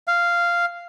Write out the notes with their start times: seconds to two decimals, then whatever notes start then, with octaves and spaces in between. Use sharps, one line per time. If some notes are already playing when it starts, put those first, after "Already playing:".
0.07 F5